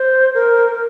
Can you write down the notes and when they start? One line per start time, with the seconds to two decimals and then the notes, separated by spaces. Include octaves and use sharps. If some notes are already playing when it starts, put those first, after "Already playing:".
Already playing: C5
0.34 A#4